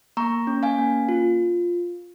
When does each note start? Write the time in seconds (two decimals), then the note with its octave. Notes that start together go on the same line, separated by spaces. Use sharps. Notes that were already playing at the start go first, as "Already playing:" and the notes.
0.17 A#3 A#5 C#6
0.47 C#4
0.63 F5 G#5
0.78 A#3
1.09 F4